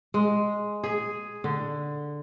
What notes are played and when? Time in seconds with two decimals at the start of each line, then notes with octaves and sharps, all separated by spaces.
0.14 G#3
0.84 G#4
1.44 D3